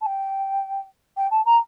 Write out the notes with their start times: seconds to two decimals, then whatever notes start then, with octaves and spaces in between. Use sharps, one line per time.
0.01 A5
0.06 G5
1.17 G5
1.31 A5
1.45 A#5